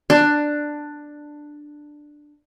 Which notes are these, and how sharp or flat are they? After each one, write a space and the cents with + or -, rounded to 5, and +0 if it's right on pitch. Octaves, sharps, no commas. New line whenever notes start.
D4 +10